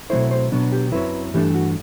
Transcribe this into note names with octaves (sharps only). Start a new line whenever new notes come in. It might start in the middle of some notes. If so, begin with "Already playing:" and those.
B2 F#3 A3 C4 E4 C5
C5
B2 F#3 B3 D4
G4
F#2 F#3 C4 E4 B4
G2 E3 A3 D4 G4
F#4